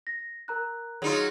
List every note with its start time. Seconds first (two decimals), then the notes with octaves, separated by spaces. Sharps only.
0.07 A#6
0.48 A#4 A#5 F#6
1.02 F#3 D#4 F4 G#4